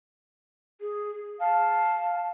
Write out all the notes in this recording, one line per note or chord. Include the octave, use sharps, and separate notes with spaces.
G#4
F5 A5